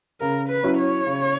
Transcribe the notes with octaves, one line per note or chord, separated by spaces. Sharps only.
C#3 A#4
B4
F#3 C#4 E4
C#5
C#3